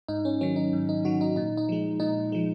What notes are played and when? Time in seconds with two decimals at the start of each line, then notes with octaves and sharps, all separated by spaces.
0.08 G#2 D#4
0.25 C#4
0.41 D#3 F#3 C#4
0.56 D#4
0.73 G#2
0.89 D#4
1.05 D#3 F#3 F#4
1.21 D#4
1.36 A#2 D#4
1.57 D#4
1.69 F3 G#3
2.00 A#2 D#4
2.32 F3 G#3